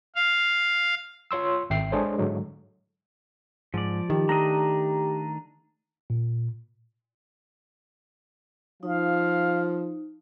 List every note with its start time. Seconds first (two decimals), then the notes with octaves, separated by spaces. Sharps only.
0.16 F5
1.31 F4 C#5 C6 E6
1.70 G#1 E5 G5 C7
1.92 G#3 D4 G#4 A4 C5 C#5
2.18 G#2 D3 F#3 G#3
3.74 G#2 F3 D5
4.10 D#3 G4
4.29 A3 D4 D#5 A#5
6.10 A#2
8.83 F3 D#4 F5